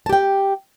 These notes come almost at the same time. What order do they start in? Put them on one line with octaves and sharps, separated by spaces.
A5 G4 G5